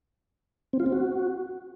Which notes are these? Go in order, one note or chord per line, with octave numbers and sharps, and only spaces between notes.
C4
F4
C4
F#4